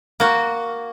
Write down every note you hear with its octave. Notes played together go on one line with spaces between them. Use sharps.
A#3 F#4